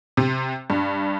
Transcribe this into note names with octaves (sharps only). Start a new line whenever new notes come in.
C3
G2